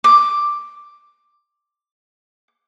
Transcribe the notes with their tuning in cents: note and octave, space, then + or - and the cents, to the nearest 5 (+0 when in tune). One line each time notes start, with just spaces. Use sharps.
D6 +5